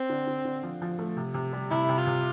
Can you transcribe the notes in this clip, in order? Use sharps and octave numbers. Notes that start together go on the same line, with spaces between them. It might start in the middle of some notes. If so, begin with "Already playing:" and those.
Already playing: C4
D3
D3
D3
F3
F3
A3
C3
C3
G3
C3 E4
C3
F4
C3